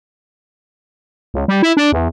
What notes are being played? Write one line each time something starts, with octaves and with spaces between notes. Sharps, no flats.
C#2
G3
E4
D4
E2